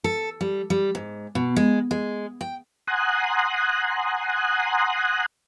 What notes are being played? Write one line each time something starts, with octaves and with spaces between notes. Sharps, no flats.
A4
G3
G3
G#2
B2
G#3
G#3
G5
F#5 G#5 A#5 C6 D#6 F#6